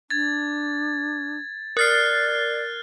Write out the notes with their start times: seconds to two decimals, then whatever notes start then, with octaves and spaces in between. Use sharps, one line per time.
0.10 D4 G#6 A6
1.77 A#4 D5 F6 F#6 A6 C7